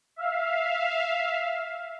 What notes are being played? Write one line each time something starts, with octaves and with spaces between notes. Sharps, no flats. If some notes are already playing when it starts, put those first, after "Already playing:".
E5 F5